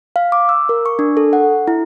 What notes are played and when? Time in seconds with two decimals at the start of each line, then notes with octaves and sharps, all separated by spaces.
0.16 F5
0.32 D6
0.49 E6
0.69 A#4
0.86 C#6
0.99 D4
1.17 A4
1.33 F#5
1.68 E4